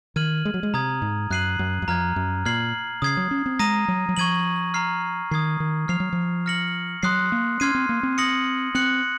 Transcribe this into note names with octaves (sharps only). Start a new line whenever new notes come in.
D#3 F6 G#6 D#7 F#7
G#3
F#3
G#3
C3 A#5 D#6 G#6
G#2
F#2 F#6 C7 D#7 F#7
F#2
F#2
F2 A#5 F6 G#6
F#2
A#2 F6 G#6 C7 F#7
C#3 D#6 G#6 C7
F#3
C#4
C4
G#3 A#5 D#6 A#6 D#7
F#3
F#3
F3 C#6 G#6 D#7 F#7
A#5 F6 C7
D#3 D#6 G#6 C7
D#3
F3 F6 C7 F7
F#3
F3
F6 A#6 C#7 F#7
F#3 C6 D#6 F#6 C7
A#3
C#4 C6 F6 G#6 C7 D#7
C4
A#3
C4
D#6 A#6 C#7 F#7
C4 F#6 C#7 F#7